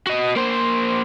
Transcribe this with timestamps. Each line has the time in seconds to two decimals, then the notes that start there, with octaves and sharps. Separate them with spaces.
0.07 F#4 D#5
0.36 A#3 C5